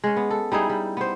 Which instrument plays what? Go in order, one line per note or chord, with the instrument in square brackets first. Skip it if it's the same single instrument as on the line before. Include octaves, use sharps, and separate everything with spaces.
[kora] G#3 C#4
B3
A4
G3 D#4 E4 G#4
G3
B3 C5